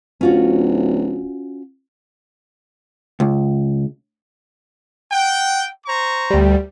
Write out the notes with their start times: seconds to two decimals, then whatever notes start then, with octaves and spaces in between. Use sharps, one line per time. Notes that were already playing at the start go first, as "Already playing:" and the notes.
0.21 D1 C#4 F4 F#4
3.20 C#2
5.12 F#5 G5
5.86 C5 A#5 C#6
6.31 D2 G3